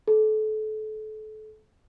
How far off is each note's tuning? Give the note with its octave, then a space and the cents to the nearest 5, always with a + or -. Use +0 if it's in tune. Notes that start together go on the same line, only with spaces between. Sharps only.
A4 -30